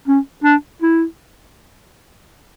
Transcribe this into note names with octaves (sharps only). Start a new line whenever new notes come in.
C#4
D4
E4